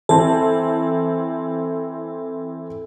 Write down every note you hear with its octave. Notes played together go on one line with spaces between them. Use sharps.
E3 C4 A4